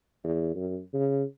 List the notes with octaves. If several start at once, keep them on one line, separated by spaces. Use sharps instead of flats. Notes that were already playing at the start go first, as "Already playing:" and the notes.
E2
F#2
C#3